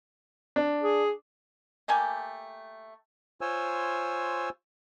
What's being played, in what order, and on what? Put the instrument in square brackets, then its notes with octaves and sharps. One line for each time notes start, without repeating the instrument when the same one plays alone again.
[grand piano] D4
[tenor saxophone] G#4
[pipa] A3 A#3 G4 G#5
[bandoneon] F4 C5 C#5 G#5 E6